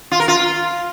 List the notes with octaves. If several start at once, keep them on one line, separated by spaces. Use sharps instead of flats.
F4
A#4
F4